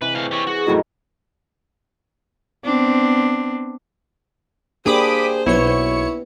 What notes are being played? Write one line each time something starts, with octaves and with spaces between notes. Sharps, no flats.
C3 E3 B4
A2 B4 F5
G4 C#5
F#4 G#4
F2 A2 F#3 D#4 A4 A#4
B3 C4 D4
A#3 D4 G4 G#4 C5 B5 D6 D#6
B1 B3 E4 C#5 C#7